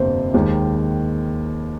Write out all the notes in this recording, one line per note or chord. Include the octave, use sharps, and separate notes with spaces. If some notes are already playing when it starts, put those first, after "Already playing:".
Already playing: G1 F2 C3 A#3 C5
D#2 D#3 G#3